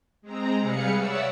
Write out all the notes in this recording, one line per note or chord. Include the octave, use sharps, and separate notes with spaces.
G#3 C4 A#5
C3 G3 G#4 B4 F5 C#7
C#5 D5 E5 F#5 E6